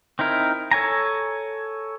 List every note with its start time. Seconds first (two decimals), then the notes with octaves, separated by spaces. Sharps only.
0.19 C4 D#4 E4 A#4
0.71 A4 C#5 G#5 A#5